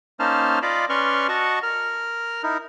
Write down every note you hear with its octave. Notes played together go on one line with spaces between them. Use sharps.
A#3 C#4 D#4 C5 A5 F6
F4 D5 D#5 F5 B5 D6
C#4 B4 D5 C6 C#6 F6
F#4 D#5 F#5 A5 C#6
A#4 F6
D#4 E4 A#4